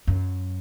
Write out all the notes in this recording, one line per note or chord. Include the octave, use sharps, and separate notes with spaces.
F#2